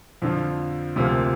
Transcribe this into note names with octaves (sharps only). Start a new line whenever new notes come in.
F2 D3 F3
D2 C3 F3 A#3